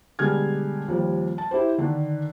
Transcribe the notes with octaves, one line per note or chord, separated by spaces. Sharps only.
B2 D3 G3 G#3 F6 G#6
D#2 F3 G3
A5
E4 G4 C5
D3 D#3 D4